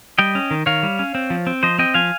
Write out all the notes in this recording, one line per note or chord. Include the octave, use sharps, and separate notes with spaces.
G3 D#5 G5
C#4
D#3
D#3 C#5 F5
G3
C#4
C4
F3
C4
F3 C5 D#5
C4 D#5 G5
F3 F5 G#5